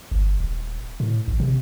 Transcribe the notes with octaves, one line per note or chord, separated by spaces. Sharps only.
G1
D#1
A2
A1
C3